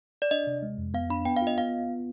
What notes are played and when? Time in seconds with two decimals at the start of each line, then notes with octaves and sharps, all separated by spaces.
0.22 D5
0.31 D4 D#5
0.47 C3
0.62 G#3
0.78 F2
0.94 B3 F5
1.10 D4 B5
1.25 B3 G5
1.37 F5
1.42 F4
1.47 D#5
1.58 B3 F5